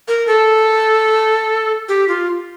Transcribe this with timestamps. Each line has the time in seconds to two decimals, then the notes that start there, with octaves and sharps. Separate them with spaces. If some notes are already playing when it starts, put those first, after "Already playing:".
0.08 A#4
0.27 A4
1.89 G4
2.09 F4